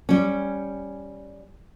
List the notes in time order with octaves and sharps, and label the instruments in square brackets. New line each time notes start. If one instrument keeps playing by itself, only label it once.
[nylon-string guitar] G3 C#4